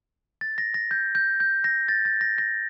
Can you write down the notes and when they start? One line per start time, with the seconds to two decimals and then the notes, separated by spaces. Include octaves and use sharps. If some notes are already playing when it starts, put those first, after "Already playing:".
0.41 A6
0.58 A#6
0.74 A#6
0.91 G6
1.15 G6
1.40 G6
1.64 A#6
1.88 A6
2.05 A6
2.21 A#6
2.38 A#6